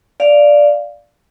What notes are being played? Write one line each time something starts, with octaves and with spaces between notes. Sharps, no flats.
D5 F5